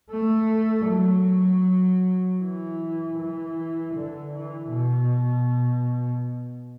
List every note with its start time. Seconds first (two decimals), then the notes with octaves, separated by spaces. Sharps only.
0.11 A3
0.87 F#3
2.40 E3
3.18 E3
3.94 D3
4.33 E3
4.70 B2